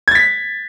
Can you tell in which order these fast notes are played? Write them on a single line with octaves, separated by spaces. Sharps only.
G#6 A6 B6